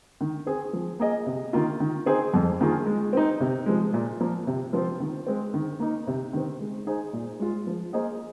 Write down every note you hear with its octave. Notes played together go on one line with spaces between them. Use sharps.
D#3
C4 G#4
F3
A#3 G#4 D#5
C3
D#3 A#3 F4
D#3
C4 D#4 G#4 C5
F2
D#3 A#3 F4 G#4
G#3
C4 D#4
C3
F3 G#3
A#2
F3 A#3
C3
F3 C4 F4 C5
D#3
G#3 C4
D#3
A#3 D#4
C3
D#3 C4
G#3
D#4 G#4 C5
A#2
G#3 F4
F3
A#3 G#4 C5 D#5